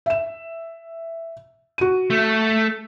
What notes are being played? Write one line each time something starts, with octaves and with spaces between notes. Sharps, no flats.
E5 E7
F#4 D#7
A3